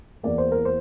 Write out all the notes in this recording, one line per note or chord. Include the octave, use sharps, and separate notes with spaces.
E2 E3 A#3 D5
C5
A#4
C5